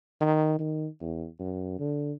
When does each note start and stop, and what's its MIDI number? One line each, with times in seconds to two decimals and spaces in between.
0.21 0.59 51
0.59 0.87 51
1.01 1.26 40
1.40 1.76 42
1.79 2.12 50